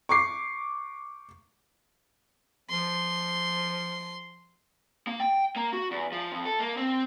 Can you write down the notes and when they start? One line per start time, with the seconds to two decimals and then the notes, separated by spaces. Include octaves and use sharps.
0.09 C#6 D6 C7
2.70 F3 C6
5.07 A#3
5.20 G5
5.56 A#3
5.73 F#4
5.91 E2
6.12 F3
6.32 F2
6.45 A4
6.60 A#3
6.77 C4